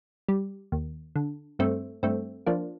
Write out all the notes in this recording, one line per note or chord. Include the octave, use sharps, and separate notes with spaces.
G3
D#2
D3
G2 A3 C4
G2 A3 C4
F3 A#3 D4